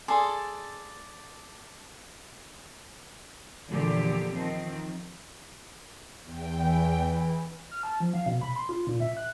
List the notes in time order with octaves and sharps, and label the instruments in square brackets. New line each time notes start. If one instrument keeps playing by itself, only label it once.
[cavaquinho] G#4 A4 D5 C6
[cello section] E2 G2 A#2 D3 F3 G4
D#3 F3 C4
[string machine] E2 G5
[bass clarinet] E3
[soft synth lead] F6
A5
F3
F5
B2
B5
C6
F4
A#2
E5
F#6